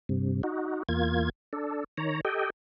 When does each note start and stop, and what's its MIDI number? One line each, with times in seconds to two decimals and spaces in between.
0.09 0.42 43
0.09 0.42 48
0.43 0.83 63
0.43 0.83 66
0.89 1.29 40
0.89 1.29 58
0.89 1.29 65
0.89 1.29 92
1.53 1.84 62
1.53 1.84 69
1.97 2.21 51
1.97 2.21 73
1.97 2.21 82
2.25 2.50 67
2.25 2.50 69
2.25 2.50 75
2.25 2.50 79